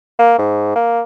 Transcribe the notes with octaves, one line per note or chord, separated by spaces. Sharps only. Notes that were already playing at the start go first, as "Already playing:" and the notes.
A#3
G#2
A#3